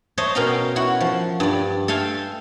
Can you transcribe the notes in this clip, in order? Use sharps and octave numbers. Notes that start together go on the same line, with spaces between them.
C5 C#5 D#5 E5 A5
B2 C#4 A#4 F5 G5 A#5
E4 F#4 F#5
F3
G2 D5
A4 E5 F5 G5 G#5